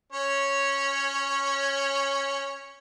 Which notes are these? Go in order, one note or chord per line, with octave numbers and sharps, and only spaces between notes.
C#4 C#5